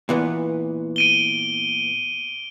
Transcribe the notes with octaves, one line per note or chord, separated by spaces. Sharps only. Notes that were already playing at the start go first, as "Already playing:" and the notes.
A#2 E3 B3
D7 D#7 G7